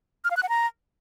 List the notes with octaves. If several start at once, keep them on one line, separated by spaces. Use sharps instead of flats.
F6
F5
F#6
F#5
A#5